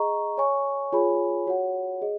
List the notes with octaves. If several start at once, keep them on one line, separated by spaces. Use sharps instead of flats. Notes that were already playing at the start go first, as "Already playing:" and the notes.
Already playing: G#4 D#5 A#5 C#6
C#5 G#5 C#6
F4 G#4 C#5 G#5 B5
F#4 C#5 F#5
G#4 D#5